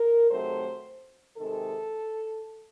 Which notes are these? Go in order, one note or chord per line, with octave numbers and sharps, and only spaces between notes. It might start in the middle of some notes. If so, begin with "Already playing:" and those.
Already playing: A#4
C3 D#3 F#3 A3 C5
C3 D#3 G#3 A4